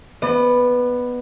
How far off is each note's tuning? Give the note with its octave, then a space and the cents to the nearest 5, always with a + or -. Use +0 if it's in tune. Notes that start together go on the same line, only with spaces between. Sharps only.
B3 +0 D5 +45